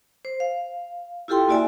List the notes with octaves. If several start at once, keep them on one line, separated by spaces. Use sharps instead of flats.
C5
F5
E4 F4 G4 A4 G5 C6
A#3 E4 F#4 D5 E5 G#5